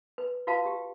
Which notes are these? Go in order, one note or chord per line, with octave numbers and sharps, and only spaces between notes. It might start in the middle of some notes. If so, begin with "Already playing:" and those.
B4
F4 F#4 B4 F5 A5
G4